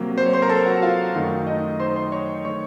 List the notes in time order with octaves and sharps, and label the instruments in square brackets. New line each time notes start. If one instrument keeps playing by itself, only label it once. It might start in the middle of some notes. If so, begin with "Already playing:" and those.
Already playing: [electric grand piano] C3 F#3 A#3
C5
C#5
C5 C6
A#4 A#5
A4 A5
F#4 F#5
F4 F5
F#2 D#3 F#3 A3
D#4 D#5
C5 C6
C5 C6
C#5 C#6
D#3 A3 C#5 C#6